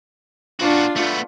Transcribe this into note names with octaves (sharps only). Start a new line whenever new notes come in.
A#2 D4 F4 F#4
A3 B3